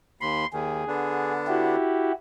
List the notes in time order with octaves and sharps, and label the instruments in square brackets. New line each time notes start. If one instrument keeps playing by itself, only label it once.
[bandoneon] D#2 B5 [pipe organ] C6
[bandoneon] D#2 D#3 [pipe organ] G#4
[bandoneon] D3 B3 D4
[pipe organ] E4 F#4 G4